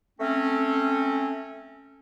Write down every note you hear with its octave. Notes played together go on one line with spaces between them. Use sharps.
A3 C4 C#4